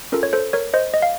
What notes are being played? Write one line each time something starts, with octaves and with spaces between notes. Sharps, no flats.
C#4 F4 A4 A#4
C#5
A4 C5
A#4 C#5
C5 D#5
D#5
F5